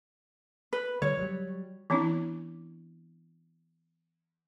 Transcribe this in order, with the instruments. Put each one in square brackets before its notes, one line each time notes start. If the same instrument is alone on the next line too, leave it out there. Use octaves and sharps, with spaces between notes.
[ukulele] B4
[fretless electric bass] D3 G3 [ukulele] C#5
[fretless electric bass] F#3 G3
[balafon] E3 B3 C4 D4 E4